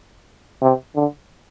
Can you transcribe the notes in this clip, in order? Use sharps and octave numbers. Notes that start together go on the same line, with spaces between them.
C3
D3